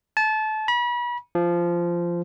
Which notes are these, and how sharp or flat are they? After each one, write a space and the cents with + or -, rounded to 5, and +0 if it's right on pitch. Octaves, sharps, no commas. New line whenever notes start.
A5 -25
B5 -35
F3 -15